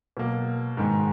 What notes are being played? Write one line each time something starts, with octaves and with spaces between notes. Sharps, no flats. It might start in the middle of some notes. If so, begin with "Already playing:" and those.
B2 F#3 A#3
G#2 D#3 G#3